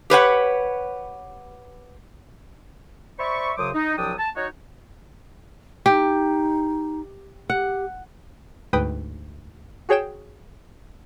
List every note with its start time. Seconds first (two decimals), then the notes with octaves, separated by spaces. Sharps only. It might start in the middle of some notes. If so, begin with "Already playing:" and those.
0.10 G4 B4 C#5 F#5
3.18 C5 D5 E5 B5 C#6
3.57 F#2 C#3 F#3 C5 D6 D#6
3.74 D#4
3.98 C2 F3 F#3 D4 G5 D#6
4.18 A5
4.36 D#4 F#4 C#5
5.86 D#4 G4
7.50 G4 F#5
8.73 D2 G#2 B4 G5 D#6
9.89 F#4 G#4 C#5 G5 E7